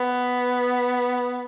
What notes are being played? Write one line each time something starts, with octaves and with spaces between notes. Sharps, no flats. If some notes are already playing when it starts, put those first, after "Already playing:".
Already playing: B3